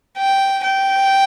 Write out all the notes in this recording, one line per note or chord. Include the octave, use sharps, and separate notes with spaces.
G5
G5